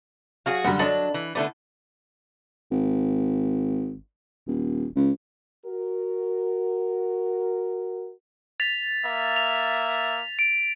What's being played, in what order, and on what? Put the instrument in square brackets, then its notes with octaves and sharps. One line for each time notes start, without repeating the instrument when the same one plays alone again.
[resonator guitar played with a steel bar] F#3 F#4 G#4 [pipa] F5
[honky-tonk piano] F#2 D3 G3 [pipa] F5 F#5
[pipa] D3 A4 D#5 [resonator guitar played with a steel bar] F#3 D4 [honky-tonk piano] F#7
[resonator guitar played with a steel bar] E3
[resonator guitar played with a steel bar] D3 A3 B3 [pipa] E4 D5
[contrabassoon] G#1
D#1
C#2
[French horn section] F#4 A#4
[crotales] A6 B6 F7
[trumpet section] A#3 E5
[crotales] F7
D7